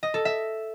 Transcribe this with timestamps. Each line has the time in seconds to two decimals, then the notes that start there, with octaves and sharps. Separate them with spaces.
0.03 D#5
0.14 A4
0.25 E5